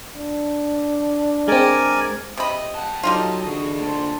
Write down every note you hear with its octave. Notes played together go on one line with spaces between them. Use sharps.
D4
G#3 C4 A#4 D5 G#5
C3 D#5 B5
F#5 G5 A5
F#3 G3 D#4 F4 A4 D#5
D3 E3 F#4 G#4
A#3 D4 C5 A5